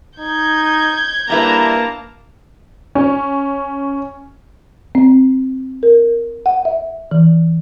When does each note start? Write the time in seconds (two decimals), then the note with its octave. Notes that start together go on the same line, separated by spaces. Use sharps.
0.19 D#4 G6 G#6
1.30 G3 A#3 D4 E4 B4 A5 A#5
2.95 C#4
4.95 C4
5.83 A#4
6.46 F#5
6.65 E5
7.11 E3